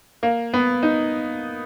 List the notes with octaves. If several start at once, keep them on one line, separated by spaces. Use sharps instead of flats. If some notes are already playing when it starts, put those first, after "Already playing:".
A#3
B3
D#4